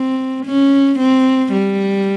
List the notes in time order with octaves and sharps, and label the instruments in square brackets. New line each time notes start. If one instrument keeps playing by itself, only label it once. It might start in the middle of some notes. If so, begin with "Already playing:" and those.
Already playing: [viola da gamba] C4
C#4
C4
G3